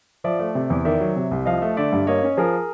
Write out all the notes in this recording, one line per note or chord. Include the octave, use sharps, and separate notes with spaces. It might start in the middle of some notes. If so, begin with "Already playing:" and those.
F3 D5 E5
A3
C3
E2
D#3 D5 E5
F#3
C3
C2
F3 D#5 F5
A3
D3 D5 E5
G2
A#3 C#5 D#5
C#4
F3 G#4 A#4